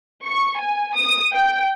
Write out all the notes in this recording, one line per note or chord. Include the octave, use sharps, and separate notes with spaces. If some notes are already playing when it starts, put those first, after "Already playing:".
C#6
G#5
D#6
G5